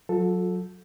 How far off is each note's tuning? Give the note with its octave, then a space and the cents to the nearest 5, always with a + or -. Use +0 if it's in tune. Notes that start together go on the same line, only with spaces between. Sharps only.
F#3 -20 F4 +45 A4 +0